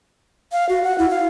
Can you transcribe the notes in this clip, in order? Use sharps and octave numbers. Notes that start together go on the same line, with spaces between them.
F5
F#4
F#5
E4
F5